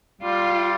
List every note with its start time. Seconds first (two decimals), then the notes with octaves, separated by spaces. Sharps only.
0.21 G3 F4